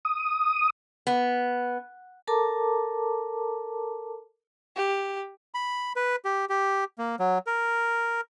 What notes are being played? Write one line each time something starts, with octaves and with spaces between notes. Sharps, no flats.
D#6
B3
A4 A#4 A5 A#5 D6
G4
B5
B4
G4
G4
A#3
F#3
A#4